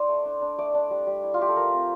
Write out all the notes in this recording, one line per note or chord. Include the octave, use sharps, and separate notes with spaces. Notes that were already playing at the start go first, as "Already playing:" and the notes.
Already playing: E4 C5 D5
A3
D4
D4
A3 D5
D4
G3
G3
E4
F4
A3 G4
A4
F3 A#4
C4